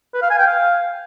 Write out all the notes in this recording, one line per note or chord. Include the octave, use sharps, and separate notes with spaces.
B4
F5
G#5
G5
F5